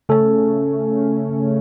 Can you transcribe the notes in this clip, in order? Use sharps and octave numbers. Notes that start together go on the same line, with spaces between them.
C#3 A3 C#4 A4